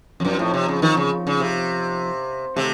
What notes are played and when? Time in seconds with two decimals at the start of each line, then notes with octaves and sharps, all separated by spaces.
0.20 F2
0.25 F#2 F3 C4 D#4
0.39 A2
0.54 C3
0.68 C#3
0.82 D#3
0.97 C#3
1.27 C#3
1.40 C3
2.56 C3 D#3 A3 D#4 F#4 A4